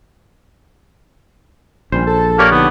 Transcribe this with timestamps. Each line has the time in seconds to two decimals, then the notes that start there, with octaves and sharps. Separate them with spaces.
1.92 A#1 D#3 G3 C#4 C5
2.07 A4 A5
2.39 A#3 G4 C#5 D5
2.51 D3 B3 D4 D#4